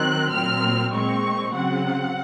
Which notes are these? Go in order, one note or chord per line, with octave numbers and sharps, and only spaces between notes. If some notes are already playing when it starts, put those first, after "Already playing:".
Already playing: D#3 F#3 C4 F#6
A#2 F#3 C4 F6
A#2 G#3 C4 C#6
C#3 F#3 C4 F#5